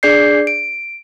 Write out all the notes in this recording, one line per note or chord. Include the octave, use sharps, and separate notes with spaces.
D4 G#4 D5 G6 C7
D7